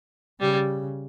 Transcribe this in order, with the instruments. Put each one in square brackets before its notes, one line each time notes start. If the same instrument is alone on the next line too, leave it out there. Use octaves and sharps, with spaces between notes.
[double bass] C#3 [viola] G3